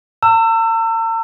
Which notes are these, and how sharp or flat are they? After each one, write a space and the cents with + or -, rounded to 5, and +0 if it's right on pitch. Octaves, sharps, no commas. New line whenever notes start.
A#5 -45 E6 +25